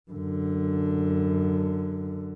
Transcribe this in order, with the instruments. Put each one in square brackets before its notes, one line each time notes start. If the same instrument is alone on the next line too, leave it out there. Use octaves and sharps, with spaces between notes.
[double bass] F#2 D3